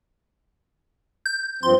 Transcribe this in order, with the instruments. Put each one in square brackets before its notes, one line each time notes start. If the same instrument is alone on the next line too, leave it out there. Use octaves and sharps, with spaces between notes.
[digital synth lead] G6
[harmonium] G2 F3 C4 [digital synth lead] C6